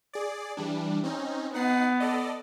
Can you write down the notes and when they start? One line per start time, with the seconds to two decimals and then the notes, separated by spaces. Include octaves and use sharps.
0.13 G#4 D5
0.57 E3 G3 D4
1.04 C4 C#4 D#4
1.54 B3 D#4 F#5 C7
2.00 A4 D5 D#5